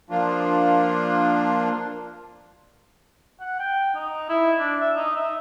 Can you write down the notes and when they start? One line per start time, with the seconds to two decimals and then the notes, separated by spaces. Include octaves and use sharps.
0.10 F3 A#3 D4 F4
3.40 F#5
3.60 G5
3.95 D#4
4.29 E4
4.60 D4
4.80 E5
4.96 D#4
5.16 E5